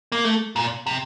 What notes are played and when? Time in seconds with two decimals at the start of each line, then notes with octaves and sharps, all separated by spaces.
0.12 A#3
0.24 A3
0.56 A#2
0.86 C3